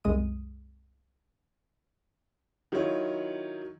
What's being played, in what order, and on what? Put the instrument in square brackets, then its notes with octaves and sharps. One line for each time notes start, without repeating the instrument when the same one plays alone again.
[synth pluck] C2 F#2 G#3 D#6 D#7
[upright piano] D#3 F#3 E4 F4 C#5